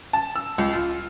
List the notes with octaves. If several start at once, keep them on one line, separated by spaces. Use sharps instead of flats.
A5
E6
C#2
F4